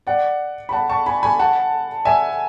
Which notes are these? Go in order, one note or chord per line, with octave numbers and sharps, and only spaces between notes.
D5 F#5
B5
F#5 A5
A5 C#6
G#5 B5
G#5 B5
F#5 A5
E5 G#5